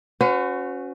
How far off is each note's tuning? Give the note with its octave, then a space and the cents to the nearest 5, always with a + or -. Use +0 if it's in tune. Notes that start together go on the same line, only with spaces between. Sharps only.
C#4 +0 F#4 -15 B4 +45